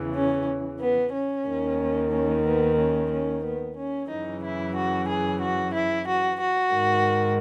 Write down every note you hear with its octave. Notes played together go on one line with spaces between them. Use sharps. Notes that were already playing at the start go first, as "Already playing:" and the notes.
Already playing: E2 C#3 E3
C#4
B3
C#4
D#2 D#3
C#4
B3
C#4
C#4
B3
C#4
F#2 C#3 E3 D#4
E4
F#4
G#4
F#4
E4
F#4
F#4
G#2 D#3